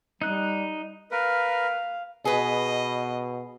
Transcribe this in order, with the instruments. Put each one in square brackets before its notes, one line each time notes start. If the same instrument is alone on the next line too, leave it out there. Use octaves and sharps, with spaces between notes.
[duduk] G3 [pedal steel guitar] D#4 F#6
[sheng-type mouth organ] A#4 B4 [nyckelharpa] F5
[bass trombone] B2 [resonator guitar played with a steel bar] G#4 B4 [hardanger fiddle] D#5